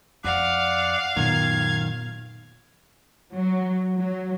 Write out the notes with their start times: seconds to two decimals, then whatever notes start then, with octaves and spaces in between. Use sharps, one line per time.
0.24 F2 D5 F5 F#5
1.16 F#2 A#2 D#3 B3 G#6
3.35 F#3
3.96 F#3